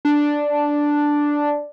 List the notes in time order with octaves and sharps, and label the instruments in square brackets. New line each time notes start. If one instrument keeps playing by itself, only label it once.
[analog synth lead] D4